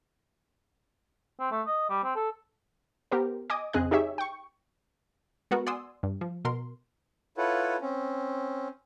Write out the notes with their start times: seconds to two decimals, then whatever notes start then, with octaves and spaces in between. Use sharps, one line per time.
1.40 C4
1.51 A3
1.66 D#5
1.90 G3
2.04 C4
2.16 A4
3.12 B3 G4 A#4 C5
3.50 D#5 G#5 D6 D#6
3.73 F2 C#3 C4 G#4 D#5 F#6
3.91 D#4 G4 G#4 C#5 E5
4.18 G5 C#6
5.51 G#3 B3 F#4 A#4
5.67 D5 F#5 G#5 C6 D#6 E6
6.03 G2
6.21 F3
6.45 B2 A#4 C6
7.37 E4 F4 A4 B4 C#5 F#5
7.81 C4 C#4